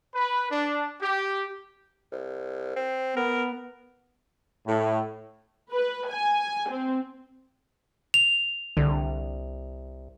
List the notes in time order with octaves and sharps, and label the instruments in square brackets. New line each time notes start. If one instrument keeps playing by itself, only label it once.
[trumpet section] B4
D4
G4
[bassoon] C2
C4
[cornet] B3 [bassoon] A#4
[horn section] A2
[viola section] B4
G#5
C4
[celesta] F7
[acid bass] C2 [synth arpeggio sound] D3